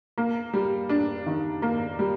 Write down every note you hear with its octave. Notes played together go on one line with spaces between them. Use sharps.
A#3
G3
D4
D#3
A#3
G3